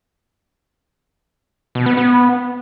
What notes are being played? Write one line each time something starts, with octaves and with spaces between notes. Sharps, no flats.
B2
B3
B3